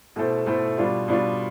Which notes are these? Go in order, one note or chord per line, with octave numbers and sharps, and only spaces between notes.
B2 A3 E4 A4 C5
B2 A3 E4 A4 C5
B2 G3 D4 F4
B2 G3 D4 F4